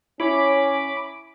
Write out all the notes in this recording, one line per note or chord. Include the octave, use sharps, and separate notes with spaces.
C#4 E4 C#5 B5 D6